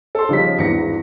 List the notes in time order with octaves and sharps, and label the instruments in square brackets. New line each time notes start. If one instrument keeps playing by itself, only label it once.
[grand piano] A4 C6
[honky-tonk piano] C#3 G3 B6 [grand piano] F3 D#4 C#5
[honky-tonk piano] G#1 E2 A#6 [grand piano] G2 E3 C#7